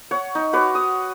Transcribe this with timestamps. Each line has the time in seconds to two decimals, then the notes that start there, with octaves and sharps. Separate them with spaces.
0.11 C#5 F#5
0.35 D#4
0.53 F#4 B4 C#5 D6
0.75 D#6